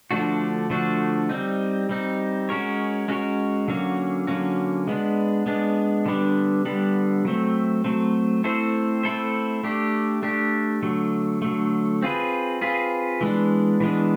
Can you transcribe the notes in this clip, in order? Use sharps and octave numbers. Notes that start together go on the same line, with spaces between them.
D3 F3 A3 D4 F#4
D3 F3 A3 D4 F#4
G3 C4 D#4
G3 C4 D#4
G#3 C#4 F#4 A#4 C#5
G#3 C#4 F#4 A#4 C#5
D3 F#3 A#3 C#4 F#4
D3 F#3 A#3 C#4 F#4
G#3 B3 D4
G#3 B3 D4
D3 G3 B3 D4
D3 G3 B3 D4
F#3 A3 C4
F#3 A3 C4
A3 C4 E4 A4 C5
A3 C4 E4 A4 C5
A3 D4 G4
A3 D4 G4
D3 F#3 A3
D3 F#3 A3
C4 F4 G#4 B4
C4 F4 G#4 B4
E3 G#3 B3 D4
E3 G#3 B3 D4